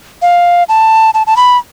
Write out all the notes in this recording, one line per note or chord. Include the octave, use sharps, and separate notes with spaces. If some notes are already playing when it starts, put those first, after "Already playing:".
F5
A5
A5
A5
B5